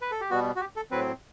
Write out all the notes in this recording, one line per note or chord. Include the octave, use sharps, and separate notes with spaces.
B4
A4
G4
B2 G3 B3 F#4
F#4
G4
A4
A2 F#3 C4 B4